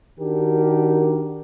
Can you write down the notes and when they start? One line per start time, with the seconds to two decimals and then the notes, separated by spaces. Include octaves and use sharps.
0.19 D#3 D4 F#4 G4 A#4